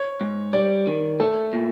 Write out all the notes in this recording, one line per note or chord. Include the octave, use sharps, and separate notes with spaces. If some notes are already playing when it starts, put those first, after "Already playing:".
Already playing: C#5
G#2
G3 D5
D#3
A3 A4
A#2